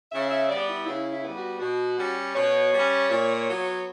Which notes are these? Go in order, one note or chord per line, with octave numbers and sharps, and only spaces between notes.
C#3 E5
E5
G3 B3 D5
E4
C#3 E4
E4
G3 B3
F#4
B2 F#4
G3 C#4
B2 C#5
G3 C#4
A#2
F#3 B3